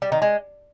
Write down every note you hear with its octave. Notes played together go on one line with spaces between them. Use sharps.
G3
D#3
G#3